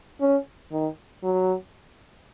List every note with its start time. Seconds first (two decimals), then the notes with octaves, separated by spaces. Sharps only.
0.21 C#4
0.72 D#3
1.24 F#3